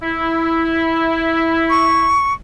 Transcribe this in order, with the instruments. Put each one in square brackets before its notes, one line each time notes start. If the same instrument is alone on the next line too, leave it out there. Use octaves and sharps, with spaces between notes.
[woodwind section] E4
[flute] C#6